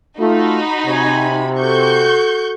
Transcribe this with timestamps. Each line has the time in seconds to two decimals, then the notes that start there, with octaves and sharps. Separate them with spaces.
0.19 A3 D#4 F4 F#4 B5
0.86 C3 C#5 G#5
1.58 F#4 A4 C#6 G6